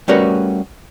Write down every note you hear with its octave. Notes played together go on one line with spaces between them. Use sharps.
G3 A3 C#4 F#4 A#4 B4